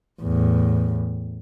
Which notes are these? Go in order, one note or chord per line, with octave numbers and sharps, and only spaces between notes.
E2 A2